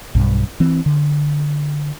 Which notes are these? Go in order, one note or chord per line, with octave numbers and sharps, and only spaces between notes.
B1 G2
E3 C4
D3